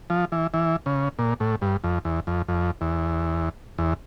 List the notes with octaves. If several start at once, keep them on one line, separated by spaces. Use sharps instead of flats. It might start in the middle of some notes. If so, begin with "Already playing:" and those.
F3
E3
E3
C#3
A#2
A2
G2
F2
E2
F2
F2
E2
E2